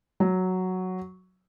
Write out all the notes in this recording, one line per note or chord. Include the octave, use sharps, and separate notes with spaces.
F#3